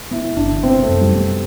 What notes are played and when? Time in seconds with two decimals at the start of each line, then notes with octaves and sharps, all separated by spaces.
0.11 B3 E4
0.37 G1 D4
0.63 B3 C4
0.83 A3
0.89 F#2
1.01 G3
1.14 B3